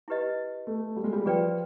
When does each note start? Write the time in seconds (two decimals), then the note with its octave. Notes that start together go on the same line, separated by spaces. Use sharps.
0.08 E4 G4 B4 D#5
0.67 A3
0.96 G3
1.04 G#3
1.13 G3
1.26 F3 G#4 B4 D5 G5